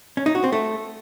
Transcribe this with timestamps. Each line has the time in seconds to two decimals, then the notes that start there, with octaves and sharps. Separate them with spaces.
0.17 C#4
0.26 D#4
0.35 F#4
0.44 C4
0.52 A3